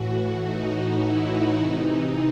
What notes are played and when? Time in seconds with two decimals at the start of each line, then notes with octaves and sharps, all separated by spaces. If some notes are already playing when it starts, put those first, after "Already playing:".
Already playing: A2 E3 F#4
0.44 D#4
1.01 E4
1.29 D#4
1.59 C3 E3